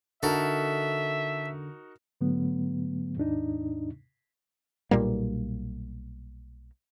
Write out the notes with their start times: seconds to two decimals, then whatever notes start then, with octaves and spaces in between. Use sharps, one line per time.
0.23 D3 D#4 F#4 A4 A#4 E5
2.21 G#2 D3 F#3 A3 B3
3.17 D#2 G#2 D4 D#4
4.91 B1 A#2 G3 A#3